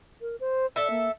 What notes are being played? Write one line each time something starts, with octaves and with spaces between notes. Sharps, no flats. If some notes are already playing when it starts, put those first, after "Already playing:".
A#4
C5
A4 D5 E5
A#3